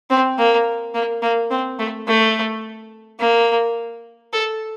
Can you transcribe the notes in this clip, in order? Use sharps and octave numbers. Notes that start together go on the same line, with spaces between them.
C4
A#3
A#3
A#3
C4
A3
A3
A#3
A4